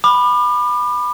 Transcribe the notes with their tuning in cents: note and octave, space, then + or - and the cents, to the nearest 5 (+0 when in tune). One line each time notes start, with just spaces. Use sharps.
B5 +0 D6 +40